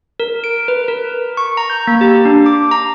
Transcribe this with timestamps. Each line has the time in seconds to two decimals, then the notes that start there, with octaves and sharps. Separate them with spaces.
0.20 A#4
0.44 D7
0.68 B4
0.88 A#4
1.37 C#6
1.57 A#5
1.70 G6
1.87 A#3
2.01 G4
2.25 D4
2.46 D6
2.71 A#5